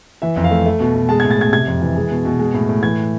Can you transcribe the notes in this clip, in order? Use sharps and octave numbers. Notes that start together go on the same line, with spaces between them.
E3 E5
F2
F5
A3
A3
B2
B2
G#3 A5
A2 G#6
A6
A2 G#6
C3 G#6
F2
E3
G#3
B2
B2
G#3
A2
A2
E3 G#6